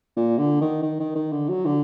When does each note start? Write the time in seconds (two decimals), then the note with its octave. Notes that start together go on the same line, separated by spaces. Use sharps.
0.16 A#2
0.38 D3
0.61 D#3
0.82 D#3
1.00 D#3
1.15 D#3
1.32 D3
1.49 F#3
1.65 D3